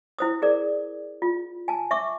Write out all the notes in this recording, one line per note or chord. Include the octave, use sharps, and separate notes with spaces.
E4 C5 D#6
G#4 A#4 D5
F4
G#5 A5
E5 C#6 D6